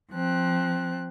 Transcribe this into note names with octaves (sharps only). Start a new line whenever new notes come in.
F3 C4 F#6